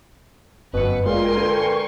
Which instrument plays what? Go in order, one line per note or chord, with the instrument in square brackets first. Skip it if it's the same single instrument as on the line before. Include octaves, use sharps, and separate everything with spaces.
[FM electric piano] G1 F#2 C#7 [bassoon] B2 [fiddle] B4
[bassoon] A#2 [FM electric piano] G#3 [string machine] A#4 G5 G#5 [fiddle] C6
[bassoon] D3 [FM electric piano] B4 [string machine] C#6